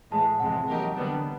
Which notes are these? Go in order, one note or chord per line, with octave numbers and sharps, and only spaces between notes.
A2 E3 G#3 A5
F2 C3 E3 G#3 F#5
F#3 A#3 D#4 G4 A#4
D3 G3 B3 D4